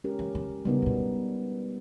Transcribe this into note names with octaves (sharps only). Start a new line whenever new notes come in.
G#3 C#4 G4 A#4
E3
E3
C#3 G3 B3 D#4 A#4
C#3
B2